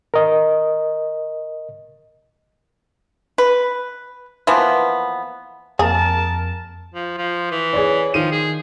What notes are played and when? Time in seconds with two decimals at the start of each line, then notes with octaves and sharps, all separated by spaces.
0.14 A#4 D#5
3.38 B4
4.47 E3 F3 A#3 B3
5.79 F2 A#3 G#4 A#4 A5
6.94 F3
7.17 F3
7.51 E3
7.73 G#4 C#5 D5
8.14 D#3 F3 D#7
8.32 G#4